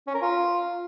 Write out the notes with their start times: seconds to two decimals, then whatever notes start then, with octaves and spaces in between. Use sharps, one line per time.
0.07 C#4
0.15 A#4
0.22 F4